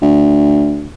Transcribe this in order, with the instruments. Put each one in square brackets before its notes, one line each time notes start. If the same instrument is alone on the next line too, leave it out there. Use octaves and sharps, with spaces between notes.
[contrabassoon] D2